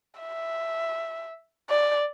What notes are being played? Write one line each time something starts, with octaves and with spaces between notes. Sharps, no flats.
E5
D5